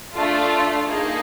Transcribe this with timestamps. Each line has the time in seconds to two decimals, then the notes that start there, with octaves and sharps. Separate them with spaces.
0.13 A3 D4 F4 A4
0.87 A#3 D#4 G#4